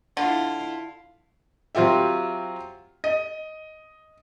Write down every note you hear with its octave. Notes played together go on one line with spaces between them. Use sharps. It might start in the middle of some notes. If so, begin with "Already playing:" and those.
D3 E4 F4
F#3 C4 F4 G4 E5
D#5